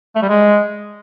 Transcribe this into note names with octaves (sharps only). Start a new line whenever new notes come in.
A3
G3
G#3